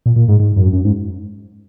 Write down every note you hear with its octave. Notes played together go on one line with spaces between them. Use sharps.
A#2
A#2
G#2
G#2
F#2
F#2
G#2